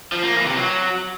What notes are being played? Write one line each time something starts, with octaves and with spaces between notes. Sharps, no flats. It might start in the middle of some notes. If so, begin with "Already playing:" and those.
F3
A#3
E3
C3
F#3